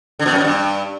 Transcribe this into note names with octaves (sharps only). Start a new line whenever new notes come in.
D3
B2
F#2
B2
G2